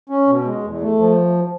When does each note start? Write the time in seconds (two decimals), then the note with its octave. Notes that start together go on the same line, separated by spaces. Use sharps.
0.10 C#4
0.27 B2
0.45 G#3
0.63 E2
0.81 A3
0.99 F3